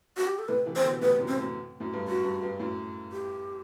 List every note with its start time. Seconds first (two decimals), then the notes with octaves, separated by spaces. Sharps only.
0.17 F#4
0.27 G4
0.39 A4
0.48 A2 C3 B4
0.66 C3 E3
0.76 C5
0.79 C3
0.84 B2 D3
1.02 A2 C3 B4
1.19 F#2 A2
1.28 C4
1.36 F#2 A2
1.80 F#2 A2
1.93 G2
2.07 F#2 F#4
2.24 G2
2.43 G2
2.60 F#2 A2
3.12 G4